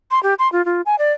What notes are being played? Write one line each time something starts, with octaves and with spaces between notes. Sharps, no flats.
C6
G4
C6
F4
F4
G#5
D5